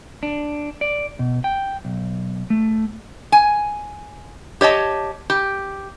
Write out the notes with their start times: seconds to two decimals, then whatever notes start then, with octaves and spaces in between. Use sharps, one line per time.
0.23 D4
0.81 D5
1.19 B2
1.44 G5
1.85 B1
2.50 A3
3.32 G#5
4.61 G4 C#5 D#5 A5
5.30 G4